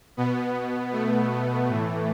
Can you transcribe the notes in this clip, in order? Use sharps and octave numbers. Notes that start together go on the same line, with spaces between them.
B2 B3
A3
A2 E3